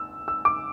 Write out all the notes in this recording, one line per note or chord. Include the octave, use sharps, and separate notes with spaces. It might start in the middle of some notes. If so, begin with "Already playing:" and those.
Already playing: E6
E6
D6